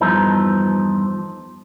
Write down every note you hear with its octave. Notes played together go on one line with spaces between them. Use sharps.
E2 G2 F3 D#4 A4